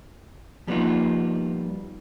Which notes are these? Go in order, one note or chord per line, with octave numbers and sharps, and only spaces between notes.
F3 G3 A#3 B3 D#4 F4